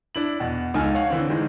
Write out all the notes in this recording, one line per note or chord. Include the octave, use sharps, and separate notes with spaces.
D4 E4 F#7
E2 B2
C#2 D#4 F4 A4 G#5 F6
C#5 F5 F#5 C#6
D3 E3 C4
D#3 E3 G#3